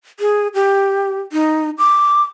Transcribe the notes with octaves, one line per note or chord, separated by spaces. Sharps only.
G#4
G4
D#4
D6